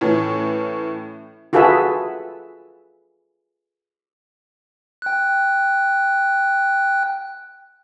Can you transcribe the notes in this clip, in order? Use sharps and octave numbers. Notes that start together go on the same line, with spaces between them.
A2 E3 C#4
F4 F#4 G#4 A4 B4 E5
G5 F#6